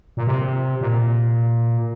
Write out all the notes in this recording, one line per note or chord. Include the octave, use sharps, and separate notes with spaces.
A#2
C3
A#2